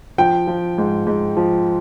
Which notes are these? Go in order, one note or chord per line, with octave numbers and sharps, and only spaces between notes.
F3 G5
F3
G#2
G#2
F3